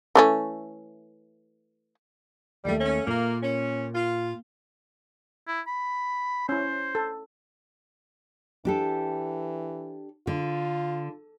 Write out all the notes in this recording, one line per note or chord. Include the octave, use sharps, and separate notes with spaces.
E3 A3 C#4
D#2 G3 A3
C#4
A#2 A#3
C#4
F4
E4
B5
C#4 E4 C5
A4
E3 D4 G4 A4
D3 F4